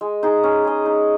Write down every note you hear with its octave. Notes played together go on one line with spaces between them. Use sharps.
G#3
D#4 G#4
C#4
G#4 D#5
D#4